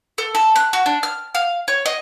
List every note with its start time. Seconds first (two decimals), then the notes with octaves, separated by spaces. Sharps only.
0.18 A4
0.35 A4
0.56 F#6
0.73 F#4
0.86 D4
1.03 F6
1.35 F5
1.68 C#5
1.86 D#5